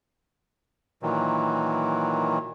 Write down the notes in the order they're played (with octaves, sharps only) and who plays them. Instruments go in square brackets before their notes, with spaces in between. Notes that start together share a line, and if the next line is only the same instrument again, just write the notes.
[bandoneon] A#2 D#3 E3 F#3